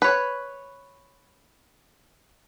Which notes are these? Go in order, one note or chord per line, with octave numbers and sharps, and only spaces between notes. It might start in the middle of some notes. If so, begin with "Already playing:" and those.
B4 C#5